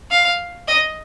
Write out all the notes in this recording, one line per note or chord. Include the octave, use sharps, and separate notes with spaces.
F5
D#5